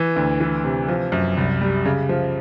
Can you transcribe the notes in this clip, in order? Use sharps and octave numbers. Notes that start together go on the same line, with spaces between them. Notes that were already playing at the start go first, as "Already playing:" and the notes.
Already playing: E3
D2
E3
C3
F3
F#2
C2
G3
C#3
F3